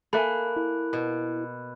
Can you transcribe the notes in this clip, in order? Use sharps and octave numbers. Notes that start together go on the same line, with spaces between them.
A#3 A4 E5 G#5 B5 F#6
E4
B2